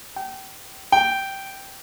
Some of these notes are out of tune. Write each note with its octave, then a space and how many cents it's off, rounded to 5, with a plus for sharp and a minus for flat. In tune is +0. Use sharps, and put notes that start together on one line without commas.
G5 -35
G5 -10